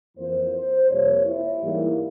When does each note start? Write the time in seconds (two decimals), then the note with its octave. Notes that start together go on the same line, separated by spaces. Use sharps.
0.17 F2 E3 A#3 C5
0.54 C5
0.90 F2 C3 G3 A#3 C#5
1.26 E4
1.62 G#2 E3 G3 A#3